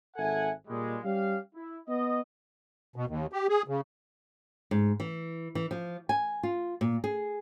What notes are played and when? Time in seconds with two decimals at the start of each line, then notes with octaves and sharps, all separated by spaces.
0.16 G#1 A4 E5 F#5 G#5
0.67 A#2 G3 G#3
1.03 G3 C#4 G4 F5
1.54 E4
1.87 B3 D#5
2.96 B2
3.08 D#2
3.33 G4
3.49 G#4
3.68 C#3
4.71 G#2
5.00 E3
5.55 E3
5.71 F3
6.09 G#5
6.43 F4
6.81 A#2
7.04 G#4